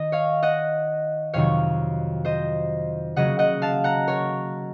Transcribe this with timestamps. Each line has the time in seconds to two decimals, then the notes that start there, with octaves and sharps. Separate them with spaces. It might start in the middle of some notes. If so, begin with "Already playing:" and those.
Already playing: D#3 D#5
0.12 C#5 F5
0.43 D#5 F#5
1.33 F2 C3 D#3 F#3 C#5 F5
2.25 C5 D#5
3.16 C#3 F#3 A#3 D#5 F#5
3.39 D#5 F#5
3.62 F5 A5
3.84 F#5 A#5
4.08 A#4 C#5